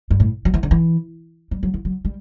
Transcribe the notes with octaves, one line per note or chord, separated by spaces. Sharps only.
G2
A2
F#3
E3
D3
E3
G3
F#3
E3
F#3
G3